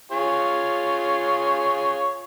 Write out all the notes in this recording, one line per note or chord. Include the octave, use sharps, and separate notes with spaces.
F4 G#4 C#5